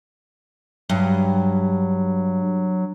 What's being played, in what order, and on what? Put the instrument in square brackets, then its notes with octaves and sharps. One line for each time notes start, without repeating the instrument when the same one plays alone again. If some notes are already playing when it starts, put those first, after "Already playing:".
[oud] G2 [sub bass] F#3